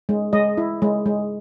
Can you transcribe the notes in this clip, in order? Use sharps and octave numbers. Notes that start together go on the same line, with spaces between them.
G#3
G#3 D#5
E4
G#3
G#3